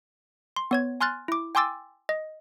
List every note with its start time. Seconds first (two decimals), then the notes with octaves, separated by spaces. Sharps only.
0.56 C6
0.71 B3 C#5 G#6
1.01 G#5 C6 F6 F#6 A6
1.28 E4 D6
1.55 G5 G#5 C6 D6 E6 A6
2.09 D#5